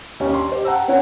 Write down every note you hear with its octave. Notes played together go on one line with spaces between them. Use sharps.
D#2 C#4
D4 C6
G4 C5
F#5 G5 A5 A#5 E6
C4 C#4 F4 C#5 F#5 G#5